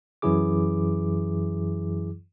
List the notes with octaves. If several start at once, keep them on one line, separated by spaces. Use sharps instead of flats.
F#2 E3 F#3 E4 G#4 D6